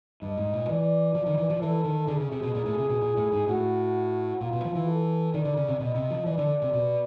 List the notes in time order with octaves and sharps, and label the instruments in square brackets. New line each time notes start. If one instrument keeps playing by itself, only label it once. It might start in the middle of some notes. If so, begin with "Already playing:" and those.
[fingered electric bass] G2 [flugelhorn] D#5
[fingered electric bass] G#2
A#2
[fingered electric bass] E3 [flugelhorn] D5
[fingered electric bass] F3
D#3
E3
F3
[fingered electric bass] E3 [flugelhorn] A4
[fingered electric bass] D#3
[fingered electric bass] D3 [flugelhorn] G#4
[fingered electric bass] C#3
C3
B2
A#2
A2
C3
B2
A#2
A2
G#2
[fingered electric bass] A2 [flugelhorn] F#4
[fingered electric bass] A#2 [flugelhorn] F4
[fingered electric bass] B2
F3
E3
[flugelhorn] A4
[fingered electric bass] D#3 [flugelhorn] D5
[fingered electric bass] D3
C#3
C3
[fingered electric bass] B2 [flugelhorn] D#5
[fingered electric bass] C3
F3
[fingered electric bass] E3 [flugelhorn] D5
[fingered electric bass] D3
C3
B2